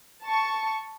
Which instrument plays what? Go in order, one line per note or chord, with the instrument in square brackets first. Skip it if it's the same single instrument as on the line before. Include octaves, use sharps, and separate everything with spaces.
[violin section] A5 C#6